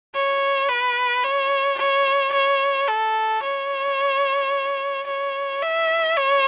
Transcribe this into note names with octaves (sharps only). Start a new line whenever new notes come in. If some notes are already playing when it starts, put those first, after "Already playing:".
C#5
B4
C#5
C#5
C#5
A4
C#5
C#5
E5
C#5